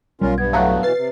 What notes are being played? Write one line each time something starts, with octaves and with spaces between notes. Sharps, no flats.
B1 G3 C#4 F4 A#4
G2 B3 G#6
A2 F#3 A3 F5 F#6
B2 E3 B4 A6 C7
C3